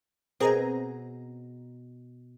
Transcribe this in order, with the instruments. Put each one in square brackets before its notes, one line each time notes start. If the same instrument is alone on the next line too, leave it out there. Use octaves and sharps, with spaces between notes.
[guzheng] B2 G#5 [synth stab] C4 G#4 A#5 [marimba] A#4 C5 D#5